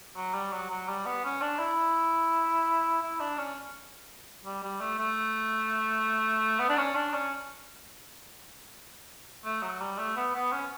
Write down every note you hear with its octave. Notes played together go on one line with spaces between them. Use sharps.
F#3
G3
F#3
F#3
G3
B3
C#4
D4
E4
E4
D4
C#4
G3
G3
A3
A3
B3
D4
C#4
D4
C#4
A3
F#3
G3
A3
B3
B3
C#4